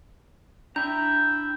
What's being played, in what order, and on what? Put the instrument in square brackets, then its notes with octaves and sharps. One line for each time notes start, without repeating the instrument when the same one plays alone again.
[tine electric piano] D4 [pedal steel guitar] E4 A#5 [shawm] G5 [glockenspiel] G6